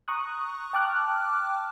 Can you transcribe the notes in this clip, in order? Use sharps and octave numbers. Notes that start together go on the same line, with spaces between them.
A#5 C#6 D#6 F#6
G5 A5 D6 F6 F#6